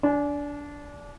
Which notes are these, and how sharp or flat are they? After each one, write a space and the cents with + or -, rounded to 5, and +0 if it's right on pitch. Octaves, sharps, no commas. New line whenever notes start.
D4 -20 G#5 +30